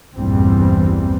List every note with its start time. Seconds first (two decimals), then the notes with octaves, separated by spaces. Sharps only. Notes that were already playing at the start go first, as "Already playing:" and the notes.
0.17 A#1 E2 G2 E3 G3 C4